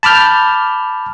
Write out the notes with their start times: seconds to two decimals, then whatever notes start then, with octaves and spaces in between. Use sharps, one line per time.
0.03 A5 B5 D6 F6 G6